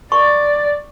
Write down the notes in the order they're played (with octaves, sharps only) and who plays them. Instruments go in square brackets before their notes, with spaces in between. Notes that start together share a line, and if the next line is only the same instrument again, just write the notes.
[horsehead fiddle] D5 [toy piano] C#6